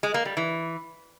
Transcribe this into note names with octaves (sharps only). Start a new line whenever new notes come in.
G#3
A#3
G3
E3